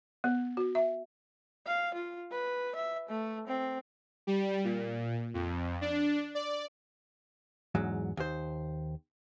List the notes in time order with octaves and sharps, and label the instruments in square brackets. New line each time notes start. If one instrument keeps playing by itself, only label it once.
[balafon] B3
F#4
E5
[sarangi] F5
F4
B4
E5
A3
C4
[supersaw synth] G3
A#2
F2
D4
D5
[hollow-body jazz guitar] E2 G#2 F#3
D#2 C5